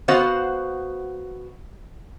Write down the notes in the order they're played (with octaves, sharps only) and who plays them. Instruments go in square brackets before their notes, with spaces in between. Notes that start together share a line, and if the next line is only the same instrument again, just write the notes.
[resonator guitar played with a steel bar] B3 F#4 C5 F5 F#5